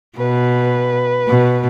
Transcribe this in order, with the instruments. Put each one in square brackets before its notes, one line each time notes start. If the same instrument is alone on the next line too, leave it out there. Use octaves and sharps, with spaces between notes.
[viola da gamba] B2 [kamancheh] B4
[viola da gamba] B2